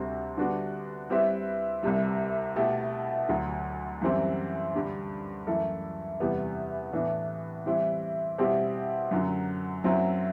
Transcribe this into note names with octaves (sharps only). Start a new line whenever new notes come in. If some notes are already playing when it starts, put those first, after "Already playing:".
Already playing: D2 C3 G3 C4 F#4
D3 G3 B3 D4 F#4
G3 C4 E4 B4 E5
C2 C3 G3
B2 A3 E4 G4
D2 D3 F#3
F#2 E3 G3 C4 E4
G2 D3 G3
F#2 E3 A3 E4 A4
E2 C3 G3 B3 E4
A2 E3 B3 D4
E3 G3 C4 E4
B2 G3 C4 E4 G4
F#2 D3 F#3
F#2 F#3 C4 E4